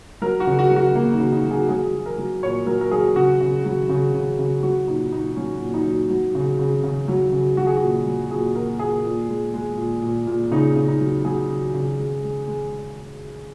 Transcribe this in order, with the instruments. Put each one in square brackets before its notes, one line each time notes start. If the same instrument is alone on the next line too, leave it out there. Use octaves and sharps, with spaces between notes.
[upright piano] F#3 A#4
F#4
C#3
F#4
F#3
F#4
F#3 A#3
D#4
C#3
D#4
F#3
G#4
F#3 G#4
F#3
A#4
F#3
A#2 C#5
F#3 A#4
A#4
F#3 G#4
C#3 F#4
C#3
F#3
C#3
C#3
C#3
F#3 F#4
A#2 D#4
A#2 D#4
F#3 C#4
A#2
D#4
F#3
F#3
C#3
C#3
C#3
F#3
C#3
F#3 F#4
G#4
F#4
A#2
F#3
A#2 G#4
A#2 A#4
A#2 G#4
A#2
G#3
G#3
A#2
A#2
A#2
C#3 D#4
C#3
D#4
F#3
F#3 G#4
C#3
C#3
G#3
G#3
G#3